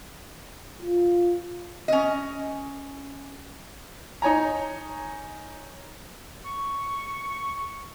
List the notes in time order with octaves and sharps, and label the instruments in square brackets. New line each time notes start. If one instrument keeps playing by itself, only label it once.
[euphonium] F4
[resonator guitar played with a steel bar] C#4 D#5
[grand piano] D#4 C#5 G#5 A#5
[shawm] C#6